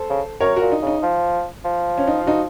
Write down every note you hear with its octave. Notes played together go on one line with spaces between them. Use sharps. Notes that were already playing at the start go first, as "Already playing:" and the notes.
Already playing: A4 C5
C#3
F#2 A#4 C#5
A#2 F#4 A#4
D#4
C#3 D#4
F3
F3
C#4
D#4
F4
D#4 F#4